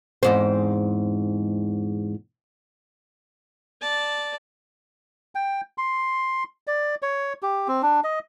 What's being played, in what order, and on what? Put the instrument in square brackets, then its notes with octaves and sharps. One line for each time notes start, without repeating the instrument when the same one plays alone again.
[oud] E2 G#2 C4
[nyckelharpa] D5 A5
[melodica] G5
C6
D5
C#5
G4
C4
D4
D#5